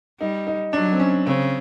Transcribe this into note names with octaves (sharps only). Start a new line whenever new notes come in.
G3 D#4
D#4
F#3 D4
C4
C#4
C#3 C4